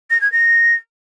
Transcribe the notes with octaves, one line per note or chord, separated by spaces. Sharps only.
A#6
G#6
A#6